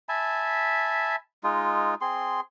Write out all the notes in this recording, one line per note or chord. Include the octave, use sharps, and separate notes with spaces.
E5 G#5 A5 B5
G#3 D#4 F4
C4 G#4 C6